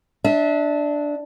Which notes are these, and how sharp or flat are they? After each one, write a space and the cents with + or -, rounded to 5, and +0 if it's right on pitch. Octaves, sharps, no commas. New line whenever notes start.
D4 +0 E5 -35